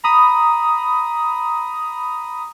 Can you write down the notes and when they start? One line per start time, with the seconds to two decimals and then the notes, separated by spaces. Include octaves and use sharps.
0.04 A#5 B5 D#6